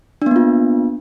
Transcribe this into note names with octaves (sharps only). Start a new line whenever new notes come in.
A#3 B3 D4 F4